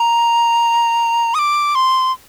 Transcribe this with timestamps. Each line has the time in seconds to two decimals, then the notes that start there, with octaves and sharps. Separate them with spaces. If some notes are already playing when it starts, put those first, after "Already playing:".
Already playing: A#5
1.34 D#6
1.39 D6
1.75 C6